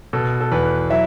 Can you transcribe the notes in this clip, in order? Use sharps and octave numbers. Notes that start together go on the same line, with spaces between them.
B2 A4
A4
E2 B4
F#3 E4 E5